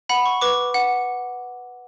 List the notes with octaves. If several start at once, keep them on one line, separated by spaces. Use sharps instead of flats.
F#5 B5
C#6
B4 D6
F#5